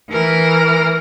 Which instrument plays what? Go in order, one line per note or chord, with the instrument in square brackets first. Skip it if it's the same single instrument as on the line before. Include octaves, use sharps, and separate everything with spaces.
[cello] E3 A#4